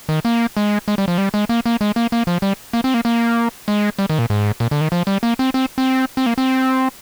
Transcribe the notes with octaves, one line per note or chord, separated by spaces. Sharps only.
D#3
A#3
G#3
G#3
G3
F3
G3
G#3
A#3
A#3
G#3
A#3
A#3
F3
G3
A#3
C4
A#3
A#3
G#3
G3
D#3
A#2
G#2
A#2
D3
D#3
F3
G3
A#3
C4
C4
C4
C4
A#3
C4